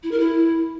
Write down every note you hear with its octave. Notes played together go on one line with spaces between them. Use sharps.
E4
A#4
E4